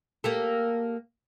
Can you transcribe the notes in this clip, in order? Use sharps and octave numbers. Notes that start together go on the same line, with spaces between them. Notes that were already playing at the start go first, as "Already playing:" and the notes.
A#3 G4 A4